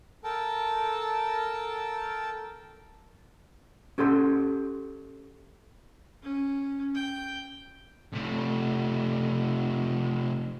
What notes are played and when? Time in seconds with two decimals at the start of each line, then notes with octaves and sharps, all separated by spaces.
0.24 A4 A#4 G5 A5
3.98 C#4 G4 A4 F#5 C6
6.23 C#4
6.95 G5
8.14 C3 A3